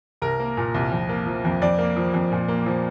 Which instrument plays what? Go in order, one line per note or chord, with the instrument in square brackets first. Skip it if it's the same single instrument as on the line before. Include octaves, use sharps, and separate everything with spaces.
[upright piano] C2 A#4
A#3
A#2
C2
F2
A#3
F3
F2
F2 D5
A#3
F3
F2
A#2
A#3
F3